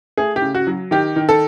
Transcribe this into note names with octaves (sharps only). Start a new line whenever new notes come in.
A3 G#4
G4
C#3
F#4
F#3
D#3 G4
D#3
A4